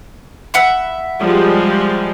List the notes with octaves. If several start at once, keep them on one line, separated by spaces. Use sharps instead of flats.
E5 F#5 B5
F3 G3 G#3